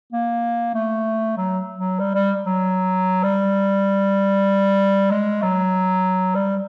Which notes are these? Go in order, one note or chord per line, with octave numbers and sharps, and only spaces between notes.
A#3
A3
F#3
F#3
G3
G3
F#3
G3
G#3
F#3
G3